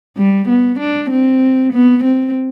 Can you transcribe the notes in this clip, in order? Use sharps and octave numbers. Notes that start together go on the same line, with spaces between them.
G3
B3
D4
C4
B3
C4